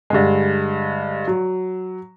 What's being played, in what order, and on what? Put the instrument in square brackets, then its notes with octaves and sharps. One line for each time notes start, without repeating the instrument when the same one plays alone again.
[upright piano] G2 D3 G#3
F#3